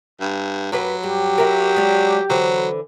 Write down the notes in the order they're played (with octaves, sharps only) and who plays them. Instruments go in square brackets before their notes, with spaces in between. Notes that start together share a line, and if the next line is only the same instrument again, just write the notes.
[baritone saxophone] G2
[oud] F#2 G4 B4 [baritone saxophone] F#3
[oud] G2 [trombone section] G4
[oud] E4 A#4
G#3 D5
[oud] D3 E3 C5 [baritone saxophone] F#3